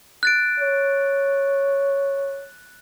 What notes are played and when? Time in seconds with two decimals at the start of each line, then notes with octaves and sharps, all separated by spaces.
0.23 F#6 A6 D7
0.60 C#5